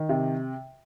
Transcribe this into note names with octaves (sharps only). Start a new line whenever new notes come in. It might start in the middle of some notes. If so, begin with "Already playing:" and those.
Already playing: D#3
C3